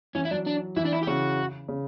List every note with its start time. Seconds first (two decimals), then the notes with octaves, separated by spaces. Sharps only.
0.15 E3 C#4
0.25 E4
0.31 F#3 D4
0.46 D4
0.77 E3 E4
0.85 D4
0.93 E4
1.03 G4
1.07 C#3 F#4
1.69 C#3